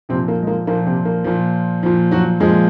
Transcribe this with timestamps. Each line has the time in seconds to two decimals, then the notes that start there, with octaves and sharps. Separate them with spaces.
0.09 C3 F3 C4
0.13 A#2
0.28 A#3
0.43 G#3
0.47 A#3
0.67 A#2 F3 A#3
0.87 C3 C4
1.05 A#3
1.24 A#2 F3
1.83 A#2 F3
2.11 F#3 F#4
2.40 A#2 F3 G#3 G#4